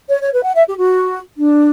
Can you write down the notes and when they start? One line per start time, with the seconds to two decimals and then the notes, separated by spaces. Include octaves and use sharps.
0.09 C#5
0.21 C#5
0.33 B4
0.43 F#5
0.55 E5
0.67 G4
0.78 F#4
1.37 D4